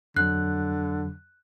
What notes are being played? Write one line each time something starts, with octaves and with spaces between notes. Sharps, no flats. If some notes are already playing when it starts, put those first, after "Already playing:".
F2 D3 F#3 F#6